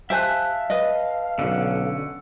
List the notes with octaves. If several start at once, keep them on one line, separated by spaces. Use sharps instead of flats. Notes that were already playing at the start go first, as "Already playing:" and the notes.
G4 C5 E5 F5 G#5 A5 F#6
B4 D#5
B1 D3 C#4 F#5